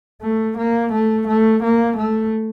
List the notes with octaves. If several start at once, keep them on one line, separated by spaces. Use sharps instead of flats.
A3
A#3
A3
A3
A#3
A3